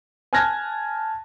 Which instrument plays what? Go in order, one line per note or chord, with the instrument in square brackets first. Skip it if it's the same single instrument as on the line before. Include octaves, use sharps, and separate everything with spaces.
[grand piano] G#5 A5 F6 F#6 G#6 A#6